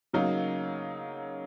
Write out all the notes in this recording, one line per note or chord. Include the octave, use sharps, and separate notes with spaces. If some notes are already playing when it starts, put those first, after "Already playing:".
C#3 F#3 A#3 D#4